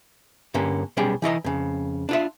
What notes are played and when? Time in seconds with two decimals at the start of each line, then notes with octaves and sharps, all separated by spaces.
0.54 G2 D3 A#3 C#4
0.97 B1 G3 C#4 G#4 G5
1.22 E3 E4 D#5 A#5
1.44 F2 C#3
2.09 D4 F4 E5